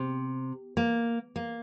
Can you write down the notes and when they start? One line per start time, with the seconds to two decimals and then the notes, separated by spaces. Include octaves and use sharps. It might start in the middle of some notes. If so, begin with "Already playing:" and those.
Already playing: C3
0.77 A#3
1.36 A#3